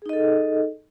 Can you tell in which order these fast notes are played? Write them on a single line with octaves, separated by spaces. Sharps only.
G#4 D#4 D#5 A4